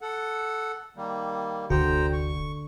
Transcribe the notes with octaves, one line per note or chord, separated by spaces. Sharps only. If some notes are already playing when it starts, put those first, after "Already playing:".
A4 F#5
D#3 G3 A#3
F1 D2 D3 F#4 C5 G5 A#5
C#6